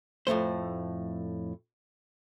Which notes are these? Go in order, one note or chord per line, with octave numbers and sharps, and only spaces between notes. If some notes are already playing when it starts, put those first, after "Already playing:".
F2 A2 D#3 A3 C5